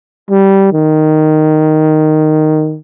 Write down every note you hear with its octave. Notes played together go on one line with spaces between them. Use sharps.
G3
D#3